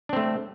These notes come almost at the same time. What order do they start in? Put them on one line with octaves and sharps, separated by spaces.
D4 C4 A3